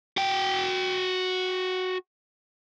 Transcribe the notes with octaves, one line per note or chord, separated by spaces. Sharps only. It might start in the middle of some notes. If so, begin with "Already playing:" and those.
F#4 G5